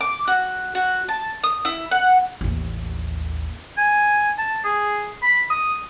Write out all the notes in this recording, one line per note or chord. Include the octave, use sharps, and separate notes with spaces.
D6
F#4
F#4
A5
D#6
E4
F#5
A1 D#2
G#5
A5
G#4
B5
D#6